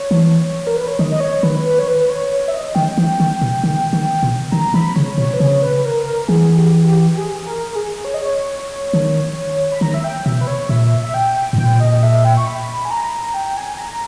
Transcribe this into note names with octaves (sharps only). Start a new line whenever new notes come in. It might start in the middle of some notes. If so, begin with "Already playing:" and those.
Already playing: C#5
E3
A#4
B4
C#5
D#3 D#5
D#5
C#5
D#3 B4
B4
C#5
B4
B4
C#5
C#5
E5
D#5
D#3 G5
E3
D#3
B2
D#3
D#3
B2
D#3 A#5
E3 B5
C#3 C#5
B2 C#5
B4
C#3 C#5
B4
B4
A#4
A#4
E3 G#4
G4
G4
G4
G#4
A#4
A#4
G#4
C#5
D#5
C#5
D#3
B5
D#3 A#5
E5
G5
B2 E5
B4
C#5
A#2 E5
E5
G5
G#2
A#2 G5
D#5
D#5
E5
G5
C#6
B5
G#5
A#5
G5
G#5
A#5
A#5